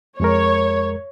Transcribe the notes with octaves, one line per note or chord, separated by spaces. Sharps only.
F2 G#3 A#4 C#5